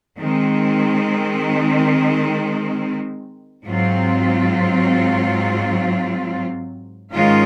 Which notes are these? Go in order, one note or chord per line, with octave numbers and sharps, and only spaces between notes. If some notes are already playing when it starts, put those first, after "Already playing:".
D#3 G#3 C4
G#2 F#3 C4 F4
G#2 D#3 G#3 C#4 F4